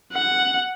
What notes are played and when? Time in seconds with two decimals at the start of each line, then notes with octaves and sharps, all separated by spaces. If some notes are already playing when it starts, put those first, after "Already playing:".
0.13 F#5